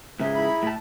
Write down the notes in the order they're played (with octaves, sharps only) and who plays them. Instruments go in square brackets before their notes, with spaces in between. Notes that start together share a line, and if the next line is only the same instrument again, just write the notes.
[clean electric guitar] G#2 C#3 G#3 [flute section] G#4 E5 A#5
[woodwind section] E4 B5
[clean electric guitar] A2 A5